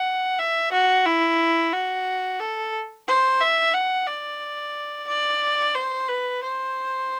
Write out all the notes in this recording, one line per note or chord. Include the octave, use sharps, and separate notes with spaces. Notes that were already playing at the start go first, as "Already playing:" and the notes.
Already playing: F#5
E5
F#4
E4
F#4
A4
C5
E5
F#5
D5
D5
C5
B4
C5